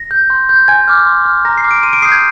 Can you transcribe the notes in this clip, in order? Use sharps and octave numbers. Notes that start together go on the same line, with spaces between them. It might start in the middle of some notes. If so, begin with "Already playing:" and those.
Already playing: A#6
G6
C6
G6
G#5 G#6
D6 F6
C6
F6
A#5 A#6
C7
D6 F6
D7
C6 D#7
D7
D#6 G6 C7
G#6